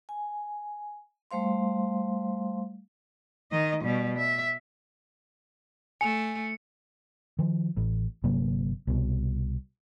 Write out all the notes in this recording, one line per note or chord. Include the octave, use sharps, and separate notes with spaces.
G#5
G3 A3 C5 F5 C6
D#3 D#5
B2 G3
E5
A3 G#5 C#7
D#3 F3
A1
G1 C3 F#3 A#3
C2 B2